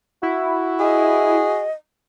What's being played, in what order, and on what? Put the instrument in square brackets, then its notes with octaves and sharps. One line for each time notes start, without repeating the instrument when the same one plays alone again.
[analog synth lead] E4 [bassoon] F#4
[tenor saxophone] G#4 [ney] D#5